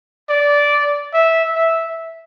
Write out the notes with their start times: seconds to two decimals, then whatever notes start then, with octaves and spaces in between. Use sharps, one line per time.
0.29 D5
1.14 E5
1.55 E5